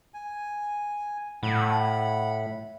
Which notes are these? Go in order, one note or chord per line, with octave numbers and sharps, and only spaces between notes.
G#5
A2 F#5 B5